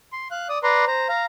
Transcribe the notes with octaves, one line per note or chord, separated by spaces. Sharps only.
C6
F5 F#6
D5 D#6
B4 D5 A#5 C6
C5 A#5
F5 A#5